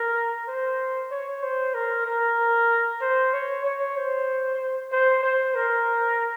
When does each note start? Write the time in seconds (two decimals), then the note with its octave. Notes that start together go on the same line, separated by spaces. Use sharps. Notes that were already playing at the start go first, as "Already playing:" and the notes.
Already playing: A#4
0.48 C5
1.11 C#5
1.43 C5
1.74 A#4
2.06 A#4
3.01 C5
3.33 C#5
3.64 C#5
3.96 C5
4.92 C5
5.23 C5
5.55 A#4